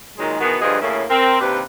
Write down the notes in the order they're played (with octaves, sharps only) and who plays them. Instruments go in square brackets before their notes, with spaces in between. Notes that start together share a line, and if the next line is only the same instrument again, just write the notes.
[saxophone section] A#2 D#3 F#3 G#3
E2 B2 D#3 B3 F#4
D2 G2 F3 G#4 B4 D#5
D2 A2 C#3 A#3 C#4 E4
C4 A#4
D#2 C3 D4 G4 B4